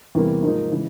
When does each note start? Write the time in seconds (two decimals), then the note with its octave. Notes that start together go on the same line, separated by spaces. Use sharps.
0.15 E2 C3 E3 G3 A#3
0.43 G#2 F3 A#3 D#4
0.72 C#3 E3 G#3